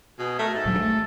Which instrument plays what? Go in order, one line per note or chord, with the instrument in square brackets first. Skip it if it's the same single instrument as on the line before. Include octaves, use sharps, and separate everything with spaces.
[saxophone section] B2 [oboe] G#4
[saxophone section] A3 [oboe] A#4
[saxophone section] G#2 [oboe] A4
[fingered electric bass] D#1 G2 F#3
A3